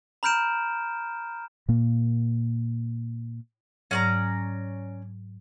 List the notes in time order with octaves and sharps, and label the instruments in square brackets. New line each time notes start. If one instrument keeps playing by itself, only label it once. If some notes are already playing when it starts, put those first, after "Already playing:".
[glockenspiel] A#5 B5 F6 G6 D7 E7
[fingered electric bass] A#2 A#3
[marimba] G#2 F#3 [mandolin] C#4 D5 A#5